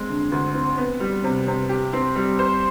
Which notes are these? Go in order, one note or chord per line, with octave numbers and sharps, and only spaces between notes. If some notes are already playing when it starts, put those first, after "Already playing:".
Already playing: G#3 C4
D3
D2
C4
B3
G3
C3
C3
G4
C4
G3
C5